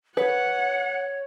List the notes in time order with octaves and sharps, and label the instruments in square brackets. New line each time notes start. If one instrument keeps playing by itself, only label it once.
[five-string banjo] B4 [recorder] C#5 [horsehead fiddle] F#5